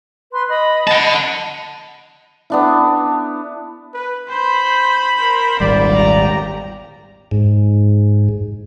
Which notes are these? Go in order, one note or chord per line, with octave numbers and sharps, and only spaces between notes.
B4 C6
D#5 B5
F#5 A5
B3 D4 E4
B4
C5 B5 G6
A#4 C5
D#1 G#1 G3 D5
G4 A#5
G#2